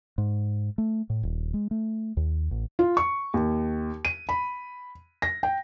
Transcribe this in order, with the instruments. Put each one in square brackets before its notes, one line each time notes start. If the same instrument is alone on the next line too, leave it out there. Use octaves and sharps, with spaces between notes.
[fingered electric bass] G#2
A3
A2
D#1
G#3
A3
D#2
A1
[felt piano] F4
C#6
D#2
D#7
B5
A#6
G5